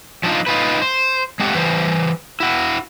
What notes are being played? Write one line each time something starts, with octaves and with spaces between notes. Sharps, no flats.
F3 F#3 D4 D#4 F4
D#4 F4 B4
C5
G#3 A3 C4 G4 F#5
E3 G3 C5
E4 F#4